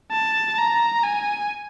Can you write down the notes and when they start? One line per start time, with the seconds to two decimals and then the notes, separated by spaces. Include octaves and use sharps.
0.12 A5
0.58 A#5
1.03 G#5